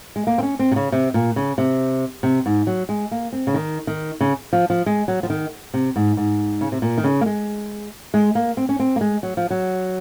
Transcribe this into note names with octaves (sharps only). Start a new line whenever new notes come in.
G#3
A#3
C4
C#4
C4
C3
C#3
C3
A#2
C#3
C3
C3
G#2
F#3
G#3
A#3
C4
C#3
D#3
D#3
C#3
F3
F3
G#3
F#3
F3
D#3
C3
G#2
G#2
C#3
C3
A#2
D#3
C#3
A#3
G#3
G#3
A#3
C4
C#4
C4
A#3
G#3
F#3
F3
F#3